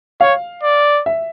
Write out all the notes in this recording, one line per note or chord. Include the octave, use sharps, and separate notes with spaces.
C#5 F5
D5
E5